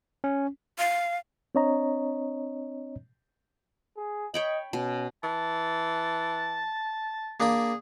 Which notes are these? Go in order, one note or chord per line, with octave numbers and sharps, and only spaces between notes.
C#4
F5
C4 D4 C#5 D#5 A#5
G#4
C#5 D#5 G5 B5
B2 C#4
E3 A5
A#3 D4 G#4 B5